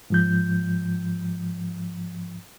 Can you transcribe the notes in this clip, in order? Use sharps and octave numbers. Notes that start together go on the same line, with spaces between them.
G#2 F3 G6